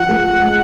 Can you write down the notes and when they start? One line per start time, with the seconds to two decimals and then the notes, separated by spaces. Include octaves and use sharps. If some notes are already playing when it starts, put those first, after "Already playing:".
Already playing: F3 F#5
0.09 A3
0.39 G#3